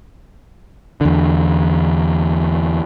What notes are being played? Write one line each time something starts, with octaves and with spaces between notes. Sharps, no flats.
E2 D3